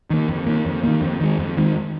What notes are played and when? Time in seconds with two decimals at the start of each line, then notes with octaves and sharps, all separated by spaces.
0.10 D#3 A#3
0.28 F2
0.47 D#3 A#3
0.65 F2
0.83 D#3 A#3
1.01 F2
1.20 D#3 G#3
1.38 F2
1.57 D#3 G#3